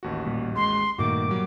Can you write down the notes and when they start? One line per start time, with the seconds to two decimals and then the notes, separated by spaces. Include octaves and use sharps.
0.03 A1 D#2 F#4
0.26 A#2 G3
0.55 G#3 C6
0.98 G2 A#2 D#3 A3 F#4 D6
1.28 F#3 G3 A#3